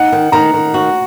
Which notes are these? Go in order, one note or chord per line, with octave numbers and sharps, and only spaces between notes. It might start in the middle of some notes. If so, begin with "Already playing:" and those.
Already playing: D#4 F#5
D#3
D#3 A#5
D#3
F#4